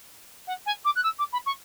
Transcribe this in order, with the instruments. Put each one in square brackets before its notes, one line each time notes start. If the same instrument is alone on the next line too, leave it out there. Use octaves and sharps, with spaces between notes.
[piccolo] F#5
G#5
D6
F#6
E6
D6
B5
C#6